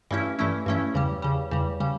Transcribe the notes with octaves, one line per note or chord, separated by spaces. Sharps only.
G2 E3 A3 C#4 E4
G2 E3 A3 C#4 E4
G2 E3 A3 C#4 E4
E2 C#3 G3
E2 C#3 G3
E2 C#3 G3
C#3 G3